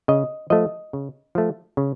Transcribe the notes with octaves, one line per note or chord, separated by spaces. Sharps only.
C#3 D#5
F3 A3 D#5
C#3
F3 A3
C#3